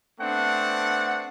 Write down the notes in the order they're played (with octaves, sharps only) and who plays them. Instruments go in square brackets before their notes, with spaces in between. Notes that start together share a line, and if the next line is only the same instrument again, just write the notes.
[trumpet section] A3 B3 C4 D4 F#5